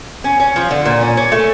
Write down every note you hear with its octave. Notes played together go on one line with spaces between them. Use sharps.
C#4
C#4
F3
D3
A#2
C#4
C#4
A3